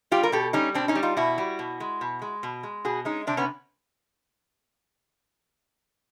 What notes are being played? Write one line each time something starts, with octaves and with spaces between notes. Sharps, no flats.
G3 F4 G4
A#4
B2 G4 A4
G3 C#4 D#4
B2 C4 D4
C#4 D#4
G3
D#4 F4
B2 E4 F#4
G3
B2
G#3
B2
G#3
B2
G#3
B2 F#4 G#4
G#3 C#4 D#4
C3 C4 D4
B3 C#4